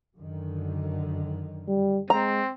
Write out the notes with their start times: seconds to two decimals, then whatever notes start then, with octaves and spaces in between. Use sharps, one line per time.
0.16 F#2 D3 D#3
1.68 G3
2.10 G#3 C4 A#5